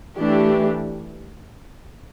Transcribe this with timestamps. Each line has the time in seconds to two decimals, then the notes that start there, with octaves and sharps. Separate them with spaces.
0.18 E3 A3 D4 G4